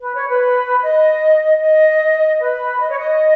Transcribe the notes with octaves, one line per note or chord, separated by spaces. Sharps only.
B4
C#5
B4
D#5
D#5
B4
D#5
C#5
D#5